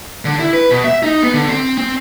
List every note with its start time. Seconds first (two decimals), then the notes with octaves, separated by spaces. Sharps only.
0.25 D3
0.39 E4
0.53 B4
0.71 B2
0.84 E5
1.03 D#4
1.22 B3
1.34 D3
1.48 C4
1.78 C4